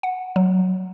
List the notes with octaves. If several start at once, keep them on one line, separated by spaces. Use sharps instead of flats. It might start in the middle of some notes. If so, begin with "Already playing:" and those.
F#5
F#3